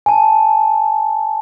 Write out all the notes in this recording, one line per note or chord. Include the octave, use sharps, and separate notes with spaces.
G#5 A5